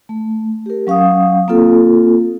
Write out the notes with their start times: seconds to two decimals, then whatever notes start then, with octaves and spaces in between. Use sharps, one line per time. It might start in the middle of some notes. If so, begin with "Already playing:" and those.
0.09 A3
0.66 G4 A#4
0.87 F#3 C#4 F5 G5 D#6
1.48 A#3 C4 F4 A4